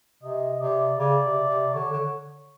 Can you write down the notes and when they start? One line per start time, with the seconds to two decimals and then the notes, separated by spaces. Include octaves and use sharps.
0.23 C3 D#5
0.61 C3 D5
0.98 C#3 D5
1.23 C3
1.48 C3
1.73 D3 C#5
1.92 D3